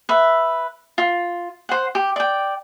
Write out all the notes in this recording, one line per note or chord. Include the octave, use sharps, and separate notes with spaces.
B4 E5
F4
C5 F#5
G4
D5 G5